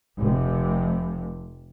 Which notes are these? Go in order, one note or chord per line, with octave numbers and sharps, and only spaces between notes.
F1 C3